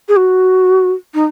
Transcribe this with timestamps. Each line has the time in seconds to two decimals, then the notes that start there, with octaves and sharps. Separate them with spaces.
0.08 G#4
0.16 F#4
1.14 D#4